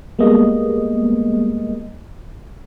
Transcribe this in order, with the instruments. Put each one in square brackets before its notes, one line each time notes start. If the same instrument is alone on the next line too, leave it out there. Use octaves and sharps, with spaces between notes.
[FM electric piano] G3 G#3 A#3 B3 D#5